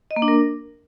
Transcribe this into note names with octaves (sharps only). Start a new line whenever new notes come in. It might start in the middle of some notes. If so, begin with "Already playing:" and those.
D#5
A#3
D4
A#4